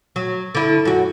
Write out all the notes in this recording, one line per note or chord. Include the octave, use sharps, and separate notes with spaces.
F#3
D3 E4
F#2 F#4